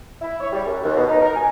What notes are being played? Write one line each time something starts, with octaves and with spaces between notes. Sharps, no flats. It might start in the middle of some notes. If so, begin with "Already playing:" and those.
E4
C#5
G3
F#2
D#2
B2
D#4
A#4
G#5